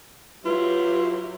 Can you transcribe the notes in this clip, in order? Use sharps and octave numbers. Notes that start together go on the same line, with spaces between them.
F#3 E4 F4 G4 B4